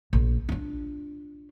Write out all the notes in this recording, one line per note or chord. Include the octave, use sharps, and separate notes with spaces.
A#1
D4 F4